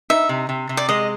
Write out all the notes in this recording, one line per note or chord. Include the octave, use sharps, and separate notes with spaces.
D#4 E5
C3
C3
C3
D5
G#3 D#5